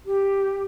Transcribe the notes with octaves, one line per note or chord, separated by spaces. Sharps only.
G4